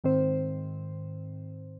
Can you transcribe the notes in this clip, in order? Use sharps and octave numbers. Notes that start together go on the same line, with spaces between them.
G#2 D#3 C4 C5